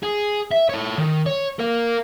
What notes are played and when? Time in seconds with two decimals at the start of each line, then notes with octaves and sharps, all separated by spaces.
0.03 G#4
0.51 E5
0.69 A4 C#5
0.98 D#3
1.26 C#5
1.60 A#4 F5